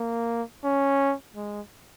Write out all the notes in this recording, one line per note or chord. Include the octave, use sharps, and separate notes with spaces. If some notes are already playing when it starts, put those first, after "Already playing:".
Already playing: A#3
C#4
G#3